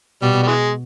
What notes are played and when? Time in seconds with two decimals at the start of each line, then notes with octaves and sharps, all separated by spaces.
0.22 B2 G3
0.43 G3
0.47 E3 G#3